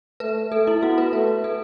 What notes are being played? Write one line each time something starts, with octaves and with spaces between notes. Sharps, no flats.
A3 B4
A3 A4
E4
B3 F#4
B4
A3 B4
A4